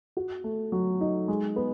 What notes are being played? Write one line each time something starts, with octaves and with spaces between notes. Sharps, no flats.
F#4
A3
F#3
D#4
G#3
B3